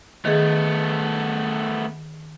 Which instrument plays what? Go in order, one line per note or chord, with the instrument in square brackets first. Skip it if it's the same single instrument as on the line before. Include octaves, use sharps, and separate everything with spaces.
[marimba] D#3 G#4 [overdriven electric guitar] A3 B3